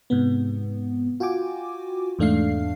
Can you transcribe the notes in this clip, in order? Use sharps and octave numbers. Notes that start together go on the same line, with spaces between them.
G#2 C3 B3
F4 F#4 G5 G#5 D6
E2 G#2 A3 D4 F5 C7